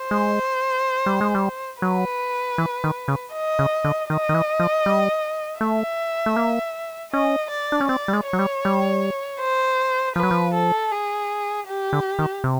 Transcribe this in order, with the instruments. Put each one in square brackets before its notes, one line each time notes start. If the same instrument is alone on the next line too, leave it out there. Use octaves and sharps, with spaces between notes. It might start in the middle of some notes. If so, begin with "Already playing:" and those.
Already playing: [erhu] C5
[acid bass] G#3
G3
G#3
G3
[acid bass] F#3 [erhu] B4
[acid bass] E3
D#3
C#3
[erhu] D#5
[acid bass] C#3
D3
[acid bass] D#3 [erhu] D#5
[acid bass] D#3
E3
F3
G3
[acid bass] A3 [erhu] E5
[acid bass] A3
A#3
[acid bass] C#4 [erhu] D#5
[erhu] D5
[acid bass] D4
C#4
[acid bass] C4 [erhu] D5
[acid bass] G3
G#3
[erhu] C#5
[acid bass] F#3
G3
G3
[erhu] C5
[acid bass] F3 [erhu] B4
[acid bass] F#3
F3
[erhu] A4
G#4
G4
[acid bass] D3
D#3
C3